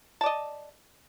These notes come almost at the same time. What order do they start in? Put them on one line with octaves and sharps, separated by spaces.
A5 D5 D#5